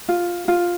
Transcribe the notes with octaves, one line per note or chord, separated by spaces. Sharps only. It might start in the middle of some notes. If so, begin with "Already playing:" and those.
F4
F4